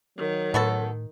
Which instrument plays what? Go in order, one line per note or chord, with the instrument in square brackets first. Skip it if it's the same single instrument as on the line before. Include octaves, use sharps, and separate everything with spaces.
[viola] D#3 [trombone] F#3
[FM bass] A2 [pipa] B3 F#4 A4